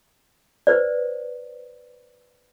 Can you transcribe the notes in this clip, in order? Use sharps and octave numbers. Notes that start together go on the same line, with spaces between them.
B4 C5 D5